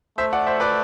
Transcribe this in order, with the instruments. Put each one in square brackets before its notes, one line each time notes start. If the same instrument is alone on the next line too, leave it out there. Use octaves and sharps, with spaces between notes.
[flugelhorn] A3 [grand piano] C5 E5
[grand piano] D5 F#5
C5 E5
B4 D5